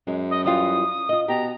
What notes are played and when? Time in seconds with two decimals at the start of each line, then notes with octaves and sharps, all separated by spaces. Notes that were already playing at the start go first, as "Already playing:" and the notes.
0.07 F#2 G#3
0.30 D#5
0.44 E3 G3 F4 D#6
1.09 F4 D#5
1.28 B2 G4 A#5